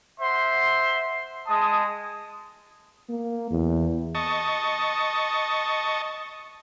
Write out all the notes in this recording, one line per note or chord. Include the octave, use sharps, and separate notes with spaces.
C5 E5 F#5 C6
G#3 A5 D#6
A#3
E2
D#5 A5 C#6